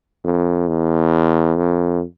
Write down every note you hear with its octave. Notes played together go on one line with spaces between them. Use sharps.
F2
E2
F2